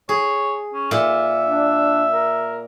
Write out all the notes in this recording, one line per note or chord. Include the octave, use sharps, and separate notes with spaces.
G#4 C#5
C#4
A#2 E5
D4
A#4